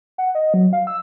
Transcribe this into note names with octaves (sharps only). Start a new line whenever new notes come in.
F#5
D#5
F#3
F5
E6